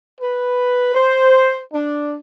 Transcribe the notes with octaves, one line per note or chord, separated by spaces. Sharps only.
B4
C5
D4